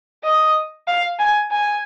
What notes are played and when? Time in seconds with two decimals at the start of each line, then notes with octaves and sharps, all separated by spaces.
0.24 D#5
0.87 F5
1.19 G#5
1.51 G#5